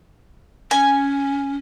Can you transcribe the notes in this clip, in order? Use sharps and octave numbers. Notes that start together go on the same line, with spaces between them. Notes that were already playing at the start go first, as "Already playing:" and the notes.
C#4 G#5